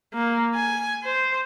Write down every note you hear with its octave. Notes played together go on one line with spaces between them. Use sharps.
A#3
G#5
C5